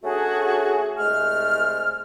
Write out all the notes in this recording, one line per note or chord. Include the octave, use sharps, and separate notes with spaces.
A3 C#4 D4 F#4 G#4
C2 G#3 A3 F6